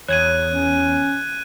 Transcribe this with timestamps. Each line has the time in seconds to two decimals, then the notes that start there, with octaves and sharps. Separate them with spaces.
0.08 E2 C#5 F#6 G#6 D#7
0.51 C#4